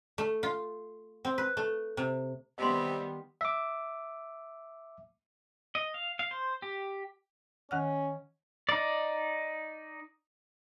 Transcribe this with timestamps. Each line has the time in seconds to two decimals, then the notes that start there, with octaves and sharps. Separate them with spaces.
0.18 A3
0.43 F4
1.25 C4
1.38 B4
1.57 A3
1.97 C3
2.58 C3 D#3 G3 B3 D#5 C6
3.41 E5 D6
5.75 D#5
5.94 F5
6.19 F5
6.31 C5
6.62 G4
7.71 D#3 C#4 F#5 F6
8.69 D#4 D5